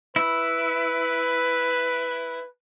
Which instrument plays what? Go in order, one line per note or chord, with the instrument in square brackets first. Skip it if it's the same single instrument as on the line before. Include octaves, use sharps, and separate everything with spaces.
[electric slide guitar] E4 [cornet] B4